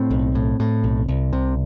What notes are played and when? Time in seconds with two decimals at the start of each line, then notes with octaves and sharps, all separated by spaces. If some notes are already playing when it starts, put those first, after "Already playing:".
Already playing: A2 C4
0.11 B1
0.35 A2
0.60 A2
0.84 B1
1.08 C2
1.33 C3